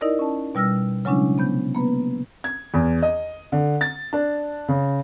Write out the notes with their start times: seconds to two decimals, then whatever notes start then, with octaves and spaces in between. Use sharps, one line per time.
0.01 D#4 E4 A#4 D5 D#5
0.19 C#4 A5
0.55 B2 G3 E6 F6 A#6
1.05 C#3 F#3 G#3 C#4 D4 E4
1.38 C3 B3 G6
1.75 A#3 B3 B4
2.44 G#6
2.74 E2
3.03 D#5
3.52 D3
3.81 A6
4.13 D4
4.68 C#3